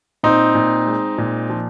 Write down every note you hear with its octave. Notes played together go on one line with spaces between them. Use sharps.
A#2 C4 D#4
A#2
G#3
A#2
F3